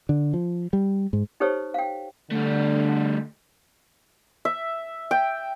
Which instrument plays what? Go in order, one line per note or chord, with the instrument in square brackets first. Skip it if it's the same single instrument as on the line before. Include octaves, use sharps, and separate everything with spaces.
[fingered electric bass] D3
F3
G3
G#2
[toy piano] D#4 G4 A4 C5 C#5 E6
F5 G5
[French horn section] D3 [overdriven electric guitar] G3 A3
[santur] E5
G5